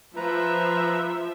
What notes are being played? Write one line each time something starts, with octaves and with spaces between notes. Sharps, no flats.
F3 B4 E5 A#5